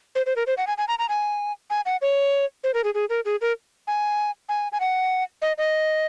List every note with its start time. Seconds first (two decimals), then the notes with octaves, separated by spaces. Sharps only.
0.15 C5
0.26 C5
0.36 A#4
0.47 C5
0.58 F#5
0.67 G#5
0.78 G#5
0.88 A#5
0.99 A#5
1.09 G#5
1.70 G#5
1.86 F#5
2.02 C#5
2.64 C5
2.74 A#4
2.84 G#4
2.94 G#4
3.10 A#4
3.25 G#4
3.41 A#4
3.87 G#5
4.49 G#5
4.72 G#5
4.80 F#5
5.42 D#5
5.58 D#5